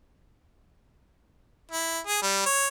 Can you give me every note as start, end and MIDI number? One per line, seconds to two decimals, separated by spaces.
1.72 1.99 64
2.07 2.21 68
2.22 2.41 55
2.46 2.68 73